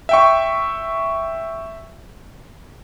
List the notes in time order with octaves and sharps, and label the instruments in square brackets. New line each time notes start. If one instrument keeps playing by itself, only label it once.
[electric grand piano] E5 G5 C#6